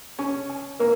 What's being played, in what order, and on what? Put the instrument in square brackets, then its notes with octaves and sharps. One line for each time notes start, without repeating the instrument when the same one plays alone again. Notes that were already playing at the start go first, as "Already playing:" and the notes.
[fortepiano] C#4 [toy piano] G#5
[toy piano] G#5
[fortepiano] A#3 [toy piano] A#4